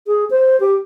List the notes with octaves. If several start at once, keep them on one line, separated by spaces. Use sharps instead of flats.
G#4
C5
G4